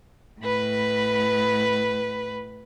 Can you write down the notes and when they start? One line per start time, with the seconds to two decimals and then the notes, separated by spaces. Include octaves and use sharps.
0.41 A2 B4 B5